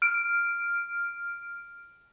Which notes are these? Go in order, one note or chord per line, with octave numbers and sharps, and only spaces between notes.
F6 D7